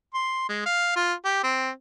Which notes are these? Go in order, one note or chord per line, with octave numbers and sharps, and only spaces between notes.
C6
G#3
F5
F4
G4
C4